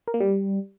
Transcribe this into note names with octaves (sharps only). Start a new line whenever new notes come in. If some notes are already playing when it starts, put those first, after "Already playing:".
A#4
A#3
G3